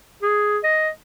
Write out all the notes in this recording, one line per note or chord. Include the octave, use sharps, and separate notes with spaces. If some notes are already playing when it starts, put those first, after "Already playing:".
G#4
D#5